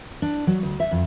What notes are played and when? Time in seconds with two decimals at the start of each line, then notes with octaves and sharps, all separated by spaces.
0.22 D4
0.47 F#3
0.63 D2
0.80 E5
0.91 F2